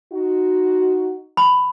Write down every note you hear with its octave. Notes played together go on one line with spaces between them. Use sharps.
D#4 F#4
B5